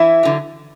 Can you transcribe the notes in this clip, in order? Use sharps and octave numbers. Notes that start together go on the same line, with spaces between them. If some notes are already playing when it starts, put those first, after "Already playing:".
Already playing: E3 E4
D3 F#3